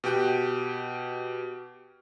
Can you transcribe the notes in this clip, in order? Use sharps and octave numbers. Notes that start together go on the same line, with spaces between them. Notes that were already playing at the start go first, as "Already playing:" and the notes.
B2 G4 G5 F#6